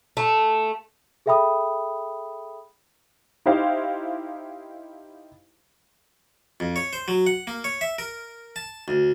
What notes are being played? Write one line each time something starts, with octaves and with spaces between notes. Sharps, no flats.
A3
G#4 A4 E5 G5 B5 D#6
D#4 E4 G4 C5 F5
F2
C#5
C5
F#3
F#5
A#3
C#5
E5
A#4
A5
D2